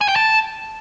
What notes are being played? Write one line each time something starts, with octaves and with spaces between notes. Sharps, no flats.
G#5
G5
A5